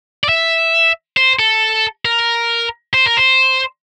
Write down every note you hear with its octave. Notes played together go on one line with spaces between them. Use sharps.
D5
E5
C5
A4
A#4
C5
A#4
C5